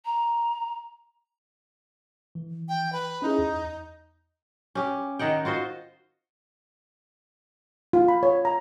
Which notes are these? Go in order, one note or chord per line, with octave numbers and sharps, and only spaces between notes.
A#5
E3
G5
B4
C#4 D#4 E4 G#4
E2
C#4 G4
D#3 D#4 F#5 G5
F4 F#4 C5 D#5
F4
B5
C#5
A#5